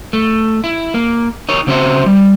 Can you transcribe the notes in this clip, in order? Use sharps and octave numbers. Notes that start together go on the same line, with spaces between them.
A3
E4
A#3
D#4 A#4 C#5
C#3 C4 F#4 C5 E5
G3